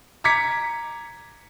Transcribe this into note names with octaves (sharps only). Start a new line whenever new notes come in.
A#5 D6 G#6 B6 C#7